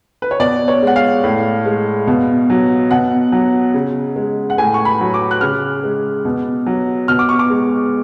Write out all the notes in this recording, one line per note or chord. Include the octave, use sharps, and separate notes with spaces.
B4
C#5
B2 D5
C#5
G#3 F#5
F5
A2
G#3
B2
F#3
B2 F#5
F#3
C#3
G#3
F#5
A2 G#5
C#6
B5
F#3
D6
F#6
C#3 F6
G#3
B2
F#3
B2 F6
D6
C#6
D6
G#3